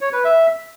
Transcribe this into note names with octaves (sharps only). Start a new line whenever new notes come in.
C#5
B4
E5